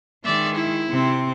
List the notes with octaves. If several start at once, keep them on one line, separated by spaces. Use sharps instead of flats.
D#3 G#3 D5 E5
E4
C3 C4